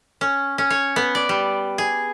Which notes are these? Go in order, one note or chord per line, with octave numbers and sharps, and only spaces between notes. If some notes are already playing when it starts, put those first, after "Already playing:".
C#4
C#4
C#5
B3
D5
G3
G#4